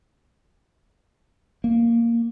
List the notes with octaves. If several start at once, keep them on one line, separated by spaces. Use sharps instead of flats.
A#3